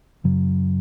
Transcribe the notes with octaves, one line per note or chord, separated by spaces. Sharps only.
F#2 C#3 F#3